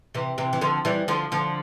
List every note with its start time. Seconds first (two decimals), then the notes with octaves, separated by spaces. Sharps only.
0.14 C3 E3
0.38 C3 E3
0.53 E3
0.61 D3 F3
0.85 E3 G3
1.08 D3 F3
1.32 D3 F3